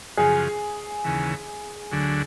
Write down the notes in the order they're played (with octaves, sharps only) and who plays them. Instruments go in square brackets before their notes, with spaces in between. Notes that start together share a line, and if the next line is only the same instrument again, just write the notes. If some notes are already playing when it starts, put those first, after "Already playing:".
[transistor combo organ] F#2 C#3 F3 [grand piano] G#4
[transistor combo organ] D#2 C#3 E3
D2 D3 F#3